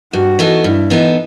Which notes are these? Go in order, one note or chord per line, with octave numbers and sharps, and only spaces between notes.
G2 F#4
E3 B3 D#4 A4
G2 E4
E3 B3 D#4 A4